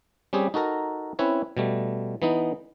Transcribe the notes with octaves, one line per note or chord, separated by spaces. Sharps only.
G3 C4 C#4 G4 G#4
D#4 F#4 A4 A#4 A#5
C4 C#4 E4 B4 C#5
B2 G3 A3
E3 B3 D#4